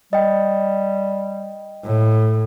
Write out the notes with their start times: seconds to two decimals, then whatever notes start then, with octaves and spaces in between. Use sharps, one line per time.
0.13 G3 D#5 G5
1.85 A2